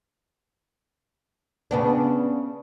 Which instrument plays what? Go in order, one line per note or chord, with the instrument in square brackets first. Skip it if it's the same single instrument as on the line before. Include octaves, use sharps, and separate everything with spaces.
[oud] C#3 B3 D4